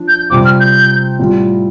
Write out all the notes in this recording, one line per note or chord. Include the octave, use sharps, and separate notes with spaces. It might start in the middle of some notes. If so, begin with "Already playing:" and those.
Already playing: F3 D4 F4
G6
C3 G3 C4 F4 D6
F6
G6
A2 G3 F4